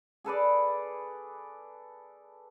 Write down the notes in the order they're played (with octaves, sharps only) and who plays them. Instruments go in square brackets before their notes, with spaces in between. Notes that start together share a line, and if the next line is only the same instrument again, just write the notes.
[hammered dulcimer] G#4 A4 B4 D5